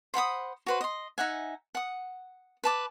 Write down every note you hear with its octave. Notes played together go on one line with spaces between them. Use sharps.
C5 F#5 B5 D#6
F#4 B4 C5
D#5 C6
D#4 E5 F#5 G#5
F#5 D#6
B4 A5 D6